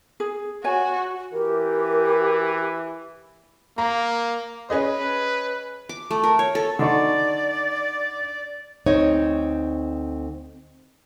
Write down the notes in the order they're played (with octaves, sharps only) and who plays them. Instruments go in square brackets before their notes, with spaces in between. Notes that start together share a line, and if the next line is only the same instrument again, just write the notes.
[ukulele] G#4
[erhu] F#4 [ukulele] C#5 G#5
[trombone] E3 [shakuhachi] G4 [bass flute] A#4
[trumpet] A#3 [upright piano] A#5
[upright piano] C#4 G#4 D#5 [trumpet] B4
[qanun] D6
A3
A#4
C#5
A4
[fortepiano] D3 D#4 C#6 [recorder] D5
[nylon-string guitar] D2 C4 D#4 C#5